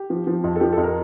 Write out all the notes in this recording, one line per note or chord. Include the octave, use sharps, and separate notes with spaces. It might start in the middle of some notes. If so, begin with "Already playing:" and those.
Already playing: G4
F3
F3
F2
A4
F3 G4
F2 A4
A#4